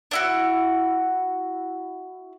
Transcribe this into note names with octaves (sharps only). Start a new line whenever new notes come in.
D4 E4 F#4